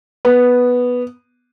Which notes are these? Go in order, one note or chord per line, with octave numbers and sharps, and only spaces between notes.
B3